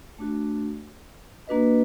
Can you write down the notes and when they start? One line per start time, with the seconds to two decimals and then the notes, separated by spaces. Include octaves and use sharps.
0.19 A3 D4 F#4
1.47 A#3 D4 F#4 B4 D#5